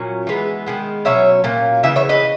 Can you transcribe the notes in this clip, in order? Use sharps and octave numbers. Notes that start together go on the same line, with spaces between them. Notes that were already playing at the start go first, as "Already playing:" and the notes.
Already playing: A#2 F#3 C#4
E3 G#3 B3
D#3 G#3 B3
B2 F#3 C#4 C#5 E5
A#2 F#3 A#3 C#4
C#3 E3 B3 E5
C#5 E5
B4 D#5